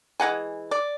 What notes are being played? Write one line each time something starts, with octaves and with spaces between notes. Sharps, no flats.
E3 G#3 F#5 G#5
D5